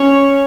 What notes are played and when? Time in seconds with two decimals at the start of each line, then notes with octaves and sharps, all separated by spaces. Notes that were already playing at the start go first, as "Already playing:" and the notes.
Already playing: C#4 C#5